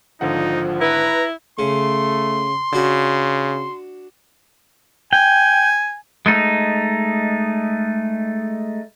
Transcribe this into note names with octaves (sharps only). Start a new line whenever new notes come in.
G#1 D3 F3 D#4 F#5
E4 B4 A#5
C#3 A3 C6
C#3 D4 F#4
G5 G#5
G#3 A3 D#4